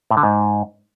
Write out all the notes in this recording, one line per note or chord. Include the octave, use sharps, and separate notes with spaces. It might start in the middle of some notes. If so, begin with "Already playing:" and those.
A2
D3
G#2